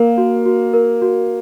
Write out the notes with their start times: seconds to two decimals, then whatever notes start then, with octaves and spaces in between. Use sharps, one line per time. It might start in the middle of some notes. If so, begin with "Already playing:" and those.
Already playing: A#3 A#4 F5
0.17 F#4
0.46 F#4
0.73 A#4
1.02 F#4